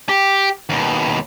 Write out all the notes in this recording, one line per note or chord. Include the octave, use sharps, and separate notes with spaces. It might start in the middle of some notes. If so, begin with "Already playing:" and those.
G4
D#2 B2